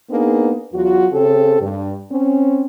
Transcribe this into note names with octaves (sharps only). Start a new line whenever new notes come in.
A#3 B3 D4 D#4 G#4
E2 F#3 F4 F#4
C#3 C4 G4 A4
G2
C4 C#4